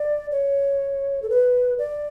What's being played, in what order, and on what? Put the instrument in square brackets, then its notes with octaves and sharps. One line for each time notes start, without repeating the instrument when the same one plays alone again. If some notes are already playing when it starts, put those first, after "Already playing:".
Already playing: [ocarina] D5
C#5
A4
B4
D5